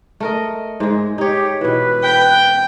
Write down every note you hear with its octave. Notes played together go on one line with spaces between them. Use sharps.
A3 A#4 D#5
G#2 G#3
D#4 G4 C#5
B2 E3 B4
G5